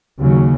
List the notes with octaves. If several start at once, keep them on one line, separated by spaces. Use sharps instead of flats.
D#2 C#3 F#3